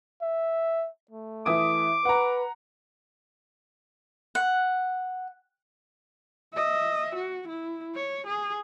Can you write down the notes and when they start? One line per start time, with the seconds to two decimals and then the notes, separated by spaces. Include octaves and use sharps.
0.22 E5
1.11 A3
1.46 E3 E4 D6 D#6
2.05 B4 F#5 A#5
4.35 F#5
6.54 D#5 E5
7.15 F#4
7.48 E4
7.95 C#5
8.27 G#4